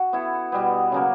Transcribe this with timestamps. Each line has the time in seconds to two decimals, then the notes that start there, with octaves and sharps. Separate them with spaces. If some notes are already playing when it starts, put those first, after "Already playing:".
Already playing: F#4
0.13 B3 E4 A4
0.52 B2 G3 B3
0.92 C#3 F#3 A#3